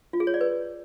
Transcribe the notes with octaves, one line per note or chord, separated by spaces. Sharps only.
F4
G#4
C#5
D5
B4